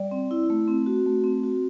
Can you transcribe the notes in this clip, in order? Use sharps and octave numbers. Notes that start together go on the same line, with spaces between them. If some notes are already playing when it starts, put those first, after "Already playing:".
Already playing: G3 D5
C4
E4
A3
C4
F#4
A3
C4
F#4